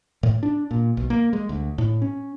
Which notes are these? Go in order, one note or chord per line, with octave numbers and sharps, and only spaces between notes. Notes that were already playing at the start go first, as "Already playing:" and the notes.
A2
D4
A#2
B1
A#3
G#3
D2
A2
C#4